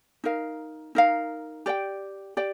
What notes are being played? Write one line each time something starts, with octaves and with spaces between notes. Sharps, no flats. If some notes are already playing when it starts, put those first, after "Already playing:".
D#4 A#4 F5
D#4 A#4 F5
G4 D5 G5
G4 D5 G5